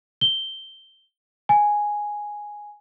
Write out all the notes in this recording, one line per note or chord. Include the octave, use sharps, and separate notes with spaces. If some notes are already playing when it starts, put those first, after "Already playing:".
G7
G#5